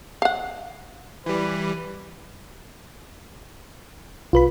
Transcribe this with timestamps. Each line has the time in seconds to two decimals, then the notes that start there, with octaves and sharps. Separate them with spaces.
0.22 F5 F#5
1.26 E3 G3 B4
4.33 B1 F4 B4 B5